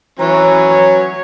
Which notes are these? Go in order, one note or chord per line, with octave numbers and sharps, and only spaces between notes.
E3 F#3 C#4 A#5
C#5